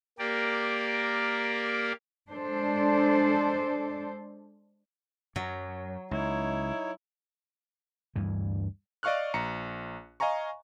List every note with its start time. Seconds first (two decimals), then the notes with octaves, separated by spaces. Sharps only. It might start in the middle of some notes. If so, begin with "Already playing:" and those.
0.19 A#3 G4 A#4 D5
2.31 G#3 D4 A4 C5
5.36 F#2 F#3
6.11 C#2 D#4 E4 C#5
8.16 D2 G2 E3
9.03 D5 D#5 F5 C#6 F6 F#6
9.34 A#1 A#5 C#7
10.20 D#5 F5 G#5 A#5 C#6